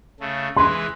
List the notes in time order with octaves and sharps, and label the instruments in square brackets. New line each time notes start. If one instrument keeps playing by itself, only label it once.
[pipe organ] C#3 A3
[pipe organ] E3 G#3 B4 [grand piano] C6